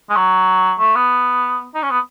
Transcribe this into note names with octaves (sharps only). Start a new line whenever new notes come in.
G#3
F#3
A3
B3
D#4
C#4
B3